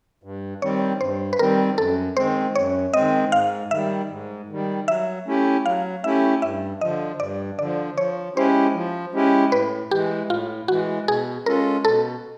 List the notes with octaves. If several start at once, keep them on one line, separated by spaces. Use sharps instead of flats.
G2
D#3 G3 C4 C#5
G2 C5
B4
D#3 G3 C4 A#4
F#2 A4
D#3 G#3 C4 C5
F#2 C#5
D#3 G#3 C4 D#5
G#2 F5
D#3 G3 E5
G#2
D#3 G3
F#3 E5
A3 C#4 E4 G4
F#3 F5
A3 C#4 E4 G4 E5
G2 E5
D3 F3 D#5
G2 D5
D3 F3 D5
F3 C#5
G#3 C#4 E4 G4 C5
F3
G#3 C#4 E4 G4
A2 B4
E3 G#3 G4
A2 F4
E3 G#3 F#4
B2 G#4
G#3 C#4 F4 A4 A#4
B2 A4